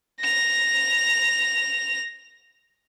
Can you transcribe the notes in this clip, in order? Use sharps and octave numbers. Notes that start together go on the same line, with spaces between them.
A#6 F7